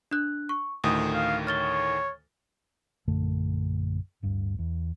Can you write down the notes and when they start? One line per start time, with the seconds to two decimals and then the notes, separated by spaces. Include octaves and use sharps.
0.11 D4 F#6
0.49 C#6
0.84 D2 A2 D#3 D#6
1.15 F5
1.47 C#5 F6 A6 G7
3.08 A#1 F#2 D3 A3
4.23 D1 G2
4.59 E2